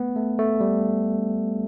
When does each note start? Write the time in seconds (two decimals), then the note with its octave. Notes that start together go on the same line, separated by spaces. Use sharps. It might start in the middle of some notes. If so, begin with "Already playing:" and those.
Already playing: A3 B3
0.16 A3
0.39 A3
0.61 G3